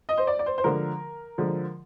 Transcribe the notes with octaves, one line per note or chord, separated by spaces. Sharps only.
D#5
C5
D5
D5
C5
C5
D3 F3 G#3 A#4
D3 F3 G#3